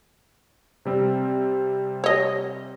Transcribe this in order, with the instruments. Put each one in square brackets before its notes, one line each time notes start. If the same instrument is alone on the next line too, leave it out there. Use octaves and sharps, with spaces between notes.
[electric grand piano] C3 G3 C4
[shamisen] C#5 D#5